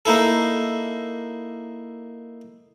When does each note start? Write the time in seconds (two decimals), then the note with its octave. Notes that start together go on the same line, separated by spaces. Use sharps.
0.05 A#3 D#4 E4 A4